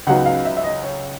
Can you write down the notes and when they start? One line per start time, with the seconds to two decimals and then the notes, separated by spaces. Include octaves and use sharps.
0.07 C#2 C#3 F#3 B3 D#4 F#5
0.26 F5
0.45 E5
0.57 E5
0.64 D#5
0.83 C#5